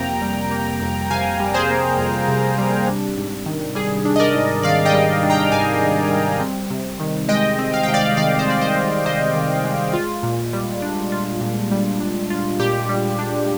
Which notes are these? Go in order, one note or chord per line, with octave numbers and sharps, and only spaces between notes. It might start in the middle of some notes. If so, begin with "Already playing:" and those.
Already playing: F2 C3 A#3 G5 A#5
G3
A#3
F2
C3 F5 G#5
G3
G#4 C5
A#3
F2
C3
G3
D4
G#2
D#3
G3 G#4
D4
D#5
A#4 D5
G#2
D#3 D5 F5
D#5 G5
G3
D4
G5 A#5
G#2 F5 G#5
D#3
G3
C4
C3
D#3
G#3 D#5 G5
C4
F5
C3 G5
D5 F5
D#3 D5 F5
C5
G#3 D5
C5 D#5
C4
C3 C5 D#5
D#3
G#3
F4
A#2
G3
D4
F4
A#2
G3
D4
F4
A#2 G4
G3
D4